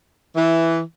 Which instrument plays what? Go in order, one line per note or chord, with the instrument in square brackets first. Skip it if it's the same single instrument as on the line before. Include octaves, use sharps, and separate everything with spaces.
[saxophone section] E3